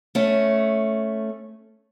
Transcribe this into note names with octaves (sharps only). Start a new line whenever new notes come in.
A3 C#4